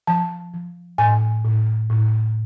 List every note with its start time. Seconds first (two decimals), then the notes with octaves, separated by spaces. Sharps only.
0.07 F3 A5
0.54 F3
0.98 A2 G#5
1.45 A2
1.90 A2